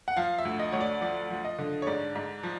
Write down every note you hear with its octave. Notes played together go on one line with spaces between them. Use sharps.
F#5
F3 F5
E5
D2
D#5
D2 C#5
D5
F3 D5
F3
D#5
D3
C#5
G#2 D5
G#2
F3